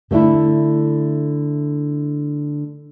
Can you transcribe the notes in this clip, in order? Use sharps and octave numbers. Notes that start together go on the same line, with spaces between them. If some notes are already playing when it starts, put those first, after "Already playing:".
D3 A3 D4 E4